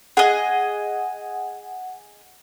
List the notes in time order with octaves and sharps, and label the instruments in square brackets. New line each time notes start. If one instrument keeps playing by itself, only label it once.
[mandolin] G#4 D#5 [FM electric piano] F#5